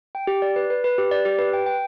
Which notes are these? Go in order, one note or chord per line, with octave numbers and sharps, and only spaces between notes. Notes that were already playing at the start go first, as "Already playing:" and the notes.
G5
G4
D5
B4
B4
B4
G4
D5
G4
B4
G5
G5